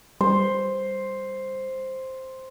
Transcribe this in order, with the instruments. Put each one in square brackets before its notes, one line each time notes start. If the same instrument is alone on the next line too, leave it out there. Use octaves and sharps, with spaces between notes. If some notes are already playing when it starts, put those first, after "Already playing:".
[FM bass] G3 [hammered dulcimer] C5